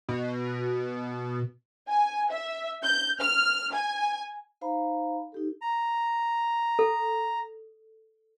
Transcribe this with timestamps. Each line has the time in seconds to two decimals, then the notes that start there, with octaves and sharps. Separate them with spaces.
0.09 B2
1.89 G#5
2.31 E5
2.83 G6
3.22 F6
3.74 G#5
4.61 D#4 C5 F5 A#5 B5
5.32 D#4 G4 A4
5.62 A#5
6.79 A4